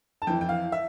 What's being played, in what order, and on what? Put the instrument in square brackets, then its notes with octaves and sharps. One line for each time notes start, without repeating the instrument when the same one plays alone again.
[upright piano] A5
F2 E3 G5
G5
F5
E5